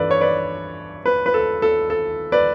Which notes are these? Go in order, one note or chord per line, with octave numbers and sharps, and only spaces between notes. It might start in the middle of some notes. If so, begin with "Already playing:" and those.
Already playing: G2 E3 A4 B4 D5
C#5
B4 D5
B4
B4
A4
A4
A4
B4 D5